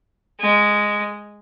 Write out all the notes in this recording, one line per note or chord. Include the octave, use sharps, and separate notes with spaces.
G#3